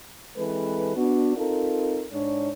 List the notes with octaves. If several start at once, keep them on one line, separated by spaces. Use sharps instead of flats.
E3 G#3 C4 A4 B4
B3 D4 F#4
C4 D#4 F4 A4 A#4
G#2 D4 C#5